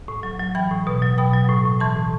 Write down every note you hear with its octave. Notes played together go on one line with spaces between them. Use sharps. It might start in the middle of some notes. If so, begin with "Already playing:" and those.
A2
F#3
F#3
E3 G5 B5
A2
B2
F#3
B2 G5 B5
F#3
A2
A2
E3 A5 C6
A2